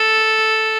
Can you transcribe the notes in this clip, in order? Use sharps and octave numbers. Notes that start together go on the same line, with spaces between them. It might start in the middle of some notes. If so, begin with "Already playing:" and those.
Already playing: A4